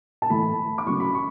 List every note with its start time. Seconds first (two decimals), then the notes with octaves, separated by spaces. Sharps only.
0.22 A5
0.30 A2 E3 A3 B5
0.78 D6
0.86 C#3 F#3 A3 C#6
1.00 B5
1.15 C#6